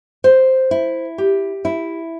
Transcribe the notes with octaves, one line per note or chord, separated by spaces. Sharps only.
C5
E4
G4
E4